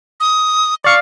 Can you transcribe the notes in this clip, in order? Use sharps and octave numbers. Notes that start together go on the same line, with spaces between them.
D#6
D5 F5 C#6